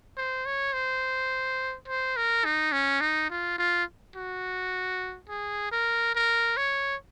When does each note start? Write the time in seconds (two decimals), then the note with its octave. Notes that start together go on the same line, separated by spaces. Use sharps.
0.17 C5
0.46 C#5
0.73 C5
1.88 C5
2.17 A#4
2.45 D#4
2.73 C#4
3.01 D#4
3.30 F4
3.58 F4
4.16 F#4
5.29 G#4
5.72 A#4
6.15 A#4
6.57 C#5